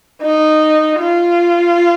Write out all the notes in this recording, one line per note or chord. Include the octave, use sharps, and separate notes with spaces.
D#4
F4